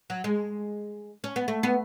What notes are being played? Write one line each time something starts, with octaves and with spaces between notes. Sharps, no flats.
F#3
G#3
C#4
B3
A3
B3